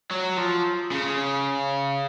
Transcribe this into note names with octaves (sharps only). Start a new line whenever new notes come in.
F#3
F3
C#3